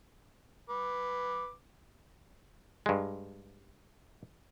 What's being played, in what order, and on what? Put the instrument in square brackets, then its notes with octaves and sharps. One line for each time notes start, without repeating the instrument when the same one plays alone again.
[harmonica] B4 D6
[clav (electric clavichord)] G2 G#3